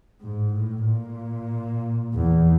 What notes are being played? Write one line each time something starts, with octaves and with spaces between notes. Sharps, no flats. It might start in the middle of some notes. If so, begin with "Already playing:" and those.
G#2
A2
A#2
E2